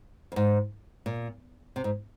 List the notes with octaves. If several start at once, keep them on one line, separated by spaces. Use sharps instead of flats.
F2
G#2
A#2
C3
G#2